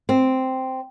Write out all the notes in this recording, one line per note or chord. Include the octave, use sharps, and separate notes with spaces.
C4